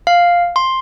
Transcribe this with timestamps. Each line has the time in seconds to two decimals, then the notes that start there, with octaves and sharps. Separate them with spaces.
0.07 F5
0.56 C6